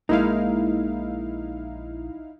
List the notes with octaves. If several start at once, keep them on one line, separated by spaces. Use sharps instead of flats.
A#1 G#3 A#3 D#4 E4 F5